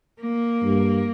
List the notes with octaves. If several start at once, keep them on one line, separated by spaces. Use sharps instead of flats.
A#3
G2